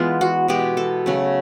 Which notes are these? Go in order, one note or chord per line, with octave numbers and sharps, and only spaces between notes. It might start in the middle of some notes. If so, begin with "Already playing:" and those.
Already playing: E3 G#3 B3 F4
F#4
B2 G#3 B3 G4
A4
C#3 F#3 A3